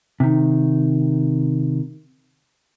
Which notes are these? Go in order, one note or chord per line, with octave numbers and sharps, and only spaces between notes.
C3 D#3